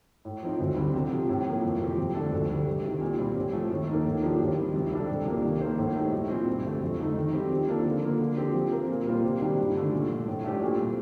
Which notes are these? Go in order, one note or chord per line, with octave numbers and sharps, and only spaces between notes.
A2
F3 C4 D#4
D2
D3 G3 C4
C3
F3 C4
A2
F3 A#3
F2
C3 F3 C4 G4
F2
D3 A3 D4 A4
D2
D3 G3
C2
C3 D#3
A#2
G3 C4
A2
F3 A3
D#2
D#3 A#3 D#4 A4
A2
F3 A#3 D4 G4
D#2
D#3 G3 C4
C2
C3 G3 D4 A4
C2
C3 F3 A#3 D4
D#3
A#3 D#4 A4 C5
A2
A3 D#4 G4
C2
A#2 F3 C4
G2
D3 A3
F2
D3 A3 D#4
D#3
G3 C4 G4
F3
A#3 D4 F4 A4
D3
F3 A#3
D3
F3 C4 G4
F3
C4 F4 A#4
A#2
G3 A#3 F4 C5
C3
D#3 G3 D4 G4
G2
D3 A3 D4
A#2
F3 A3
A2
A3 D4 G4 C5
A#2
G3 C4